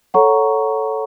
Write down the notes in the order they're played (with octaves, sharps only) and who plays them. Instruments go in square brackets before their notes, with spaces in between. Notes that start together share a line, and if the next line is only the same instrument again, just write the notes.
[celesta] A4 C#5 F#5 A#5 C#6